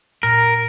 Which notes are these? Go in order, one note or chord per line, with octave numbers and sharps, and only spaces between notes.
A#2 A#4